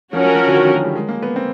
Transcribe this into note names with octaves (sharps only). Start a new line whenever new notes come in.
F3 C#4 F#4 A#4
F#3
F3
D3
D#3
F3
F#3
G3
G#3
A#3
B3
C4